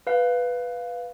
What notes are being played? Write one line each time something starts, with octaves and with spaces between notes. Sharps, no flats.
B4 F5